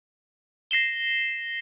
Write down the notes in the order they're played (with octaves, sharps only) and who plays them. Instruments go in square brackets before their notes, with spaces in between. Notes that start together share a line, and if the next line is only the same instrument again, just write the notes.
[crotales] A#6 C7 E7 G7